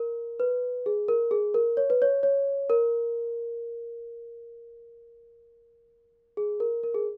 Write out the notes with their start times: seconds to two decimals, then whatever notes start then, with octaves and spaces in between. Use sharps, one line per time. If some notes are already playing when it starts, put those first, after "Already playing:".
Already playing: A#4
0.40 B4
0.86 G#4
1.08 A#4
1.31 G#4
1.54 A#4
1.77 C#5
1.90 B4
2.02 C#5
2.23 C#5
2.70 A#4
6.37 G#4
6.60 A#4
6.83 A#4
6.94 G#4